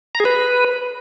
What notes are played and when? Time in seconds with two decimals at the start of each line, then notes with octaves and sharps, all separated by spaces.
0.15 A#5
0.20 G#4
0.25 B4